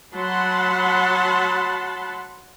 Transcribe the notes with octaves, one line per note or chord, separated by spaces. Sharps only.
F#3 F#5 A5 B5 C6